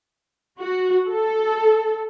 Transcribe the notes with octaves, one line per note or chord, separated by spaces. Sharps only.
F#4
A4